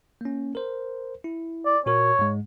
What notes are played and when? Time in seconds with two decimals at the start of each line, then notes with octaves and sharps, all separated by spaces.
0.21 A#3 C#4
0.55 A#4 C5
1.24 E4
1.65 D5
1.86 A#2 F#4 A#4 C#5
2.19 G#2 G#3